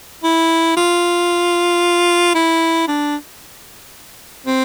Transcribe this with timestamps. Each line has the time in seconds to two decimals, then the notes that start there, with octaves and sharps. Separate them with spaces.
0.24 E4
0.77 F4
2.35 E4
2.88 D4
4.46 C4